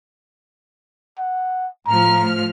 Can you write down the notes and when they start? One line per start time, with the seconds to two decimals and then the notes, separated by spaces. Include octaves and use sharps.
1.19 F#5
1.87 A2 F3 A#5 F6